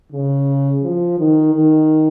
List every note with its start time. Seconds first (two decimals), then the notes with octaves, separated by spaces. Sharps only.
0.12 C#3
0.82 F3
1.18 D#3
1.54 D#3